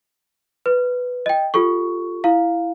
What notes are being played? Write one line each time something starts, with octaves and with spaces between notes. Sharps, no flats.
B4
D#5 G5
F4 G4 A4 C#6
E4 F5